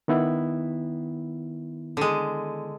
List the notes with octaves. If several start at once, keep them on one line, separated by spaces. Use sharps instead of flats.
D#3 B3 E4
D3 G#3